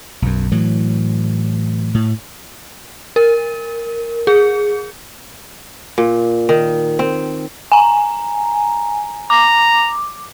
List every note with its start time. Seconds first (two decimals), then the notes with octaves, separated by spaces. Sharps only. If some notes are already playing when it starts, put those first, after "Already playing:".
0.22 B1 F#2
0.52 A2 E3 F#3
1.94 A2
3.16 A#4
4.27 G#4
5.98 A#2
6.49 D#3
6.99 C4
7.72 G#5 A#5
9.30 A#5 D6